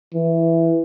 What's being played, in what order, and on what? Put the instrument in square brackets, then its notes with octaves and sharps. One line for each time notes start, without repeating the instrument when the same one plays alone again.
[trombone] E3